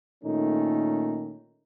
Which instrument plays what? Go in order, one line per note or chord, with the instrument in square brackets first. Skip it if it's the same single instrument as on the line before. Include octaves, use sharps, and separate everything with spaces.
[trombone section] A#2 D#3 A3 C#4 D#4